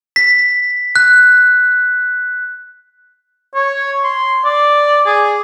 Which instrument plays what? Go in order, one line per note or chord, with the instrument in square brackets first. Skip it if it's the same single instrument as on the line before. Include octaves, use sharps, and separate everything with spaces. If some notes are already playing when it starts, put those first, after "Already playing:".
[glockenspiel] B6
F#6
[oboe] C#5
C6
D5
G#4